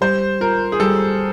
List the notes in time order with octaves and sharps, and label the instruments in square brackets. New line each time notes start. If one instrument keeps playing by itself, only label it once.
[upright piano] G3 [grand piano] C5
[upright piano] F4 [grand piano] A#4
[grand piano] G#4
[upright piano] G3 [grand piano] A4